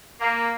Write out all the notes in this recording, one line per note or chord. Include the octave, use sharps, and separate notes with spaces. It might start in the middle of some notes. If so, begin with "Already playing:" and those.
A#3